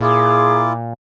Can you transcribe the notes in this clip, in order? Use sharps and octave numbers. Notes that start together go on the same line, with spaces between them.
A#2 E4 F4 G#4 D6